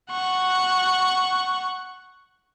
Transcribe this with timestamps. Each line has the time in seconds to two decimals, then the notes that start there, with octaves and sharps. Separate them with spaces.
0.11 F#5 C#6